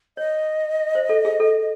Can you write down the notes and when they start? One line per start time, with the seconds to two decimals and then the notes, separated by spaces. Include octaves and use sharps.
0.17 C#5 D#5
0.95 C5
1.09 A4
1.25 G#4
1.40 A4